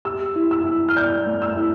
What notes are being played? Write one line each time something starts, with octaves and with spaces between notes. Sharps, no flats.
G4 E6
E4
E6
E4
F6
D5 G6
A3
E6
E4